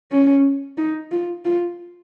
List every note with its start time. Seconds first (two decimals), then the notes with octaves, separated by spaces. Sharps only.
0.11 C#4
0.78 D#4
1.12 F4
1.45 F4